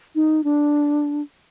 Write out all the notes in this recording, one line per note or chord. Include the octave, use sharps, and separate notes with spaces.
D#4
D4